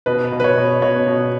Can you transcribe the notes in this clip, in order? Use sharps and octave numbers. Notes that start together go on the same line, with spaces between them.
B2 B4
B2
B4
C#5
B2
B2 C#5
B2